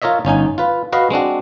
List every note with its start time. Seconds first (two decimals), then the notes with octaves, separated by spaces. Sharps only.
0.02 F4 A#4 C#5 D#5 E5
0.25 G1 C#4 D#4 G#5
0.58 F4 B4
0.93 F#4 B4 D#5 F5
1.11 G#3 C4 D4 F#4